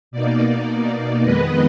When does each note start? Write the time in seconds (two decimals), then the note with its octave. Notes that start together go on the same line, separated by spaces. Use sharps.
0.11 B2 A#3 D#4 D5
0.67 D5
1.22 F2 D#3 G#3 B3 B4 D#5